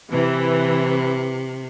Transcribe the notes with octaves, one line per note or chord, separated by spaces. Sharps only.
C3 E3